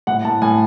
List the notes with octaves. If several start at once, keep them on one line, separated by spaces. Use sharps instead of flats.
A2 F#5
A2 A5
A2 G#5